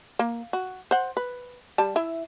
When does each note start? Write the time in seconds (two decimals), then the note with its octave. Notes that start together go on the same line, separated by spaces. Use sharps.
0.19 A#3
0.53 F#4
0.91 C5 F#5
1.17 B4
1.78 G3 A5
1.96 E4 E5